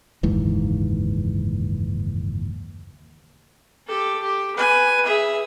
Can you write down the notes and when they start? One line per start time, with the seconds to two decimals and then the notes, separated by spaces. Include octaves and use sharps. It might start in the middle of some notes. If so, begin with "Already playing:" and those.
0.23 F#1 D#2 G#2 E3
3.87 G4 A4
4.22 G4
4.56 B4 G#5
5.06 G#4 E5